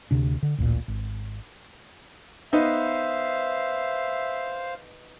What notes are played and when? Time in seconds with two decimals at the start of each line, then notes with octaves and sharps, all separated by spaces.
0.11 D2 C3 D4
0.43 D3
0.58 A1 D2 A#2
0.88 G#1
2.53 B3 D#4 B4 C5 E5 F5